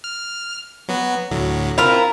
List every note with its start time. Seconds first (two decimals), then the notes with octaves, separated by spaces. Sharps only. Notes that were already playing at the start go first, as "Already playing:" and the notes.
0.04 F6
0.89 F#3 B3 F#4
1.31 D2 A2 F#3
1.78 C4 E4 F4 A#4